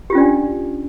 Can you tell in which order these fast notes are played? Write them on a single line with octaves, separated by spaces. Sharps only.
G4 F4 C#4 D5 D4